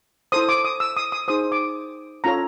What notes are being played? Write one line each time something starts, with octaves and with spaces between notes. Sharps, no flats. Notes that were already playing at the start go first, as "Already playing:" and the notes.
E4 A4 C5 D#6
D6
D#6
E6
D#6
D#6
D#4 G#4 C5 D#6
D6
C#4 F4 A4 C#5 A#5